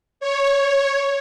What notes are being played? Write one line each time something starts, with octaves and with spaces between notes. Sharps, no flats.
C#5